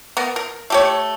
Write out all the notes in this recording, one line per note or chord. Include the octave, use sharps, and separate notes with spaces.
B3 A#4
A#4
A3 G4 C#5